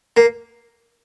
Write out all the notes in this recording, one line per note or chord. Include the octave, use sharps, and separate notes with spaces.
A#3